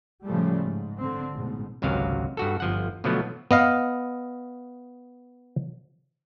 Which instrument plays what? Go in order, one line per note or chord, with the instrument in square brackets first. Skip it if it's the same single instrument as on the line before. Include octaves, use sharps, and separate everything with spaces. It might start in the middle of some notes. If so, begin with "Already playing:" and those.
[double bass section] A2 C#3 F3 G3 A3
G#2
D3 C4
A1 G#2 B2
[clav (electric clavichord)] G#1 C#2 C3 F#3 F5
G2 F#4 A4
G1 F3 F#5
B2 D3 F3 F#3 A3 B3
B3 D#5 F5